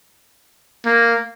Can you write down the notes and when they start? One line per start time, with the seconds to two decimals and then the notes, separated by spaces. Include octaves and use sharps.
0.85 A#3